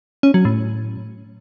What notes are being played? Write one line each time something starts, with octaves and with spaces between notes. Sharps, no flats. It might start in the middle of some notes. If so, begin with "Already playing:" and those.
C#4
F#3
A2